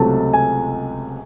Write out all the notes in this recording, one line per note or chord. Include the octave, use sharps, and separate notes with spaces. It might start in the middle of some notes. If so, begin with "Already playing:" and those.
Already playing: C#2 C3 F#3 A3 A5
G#5